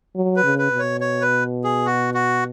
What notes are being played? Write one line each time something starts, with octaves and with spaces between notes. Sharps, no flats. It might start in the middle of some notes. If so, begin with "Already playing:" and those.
F#3
B4
C#3
B4
B2
C#5
C#5
B4
G#4
F#4
F#4